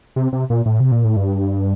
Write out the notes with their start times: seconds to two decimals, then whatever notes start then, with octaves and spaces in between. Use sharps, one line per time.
0.16 C3
0.33 C3
0.50 A#2
0.66 A2
0.80 C3
0.92 A#2
1.04 A2
1.16 G2